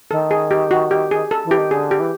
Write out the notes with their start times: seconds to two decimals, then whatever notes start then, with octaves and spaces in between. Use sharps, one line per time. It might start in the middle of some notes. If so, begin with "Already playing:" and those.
0.11 D#3 A4
0.31 G#4
0.51 G4
0.71 F#4
0.91 G4
1.11 G#4
1.31 A4
1.45 E3
1.51 G4
1.58 D#3
1.71 D3 G#4
1.91 G4
2.00 E3